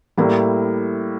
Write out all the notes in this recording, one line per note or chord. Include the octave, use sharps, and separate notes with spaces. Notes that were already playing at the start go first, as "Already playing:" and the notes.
A2 G3 A#3 E4